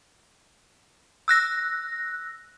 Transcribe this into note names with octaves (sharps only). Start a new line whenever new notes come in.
E6 F#6 A#6